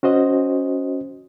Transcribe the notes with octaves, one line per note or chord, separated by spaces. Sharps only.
C#4 F#4 C5 D#5